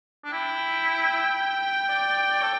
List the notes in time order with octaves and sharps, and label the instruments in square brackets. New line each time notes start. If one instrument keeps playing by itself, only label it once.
[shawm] D4
[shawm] E4 [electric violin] G5
[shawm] D5
D5
D5
A4